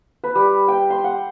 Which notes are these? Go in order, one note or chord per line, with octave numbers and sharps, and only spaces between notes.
B4
G3
G5
C6
F#5